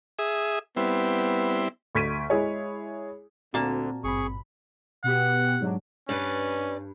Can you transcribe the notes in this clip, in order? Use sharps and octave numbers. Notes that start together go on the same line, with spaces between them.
G#4 E5 D#6
G3 B3 C4 E4
D2 C#6 G#6 B6 D7 D#7
G#3 E4 G#4 C#5
D2 A#2 D3 A#3 C4 F#4 A5
G#1 G2 C4 G#4 B5 C#6
B2 B3 G4 F#5
G#2 F#3 D4
G2 C#4 B4 D5